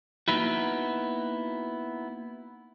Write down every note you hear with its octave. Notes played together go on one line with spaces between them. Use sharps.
A#3 B3 D#4 E4 F#4